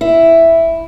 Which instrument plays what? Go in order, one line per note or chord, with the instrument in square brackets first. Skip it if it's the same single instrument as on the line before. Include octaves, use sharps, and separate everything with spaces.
[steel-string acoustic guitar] E4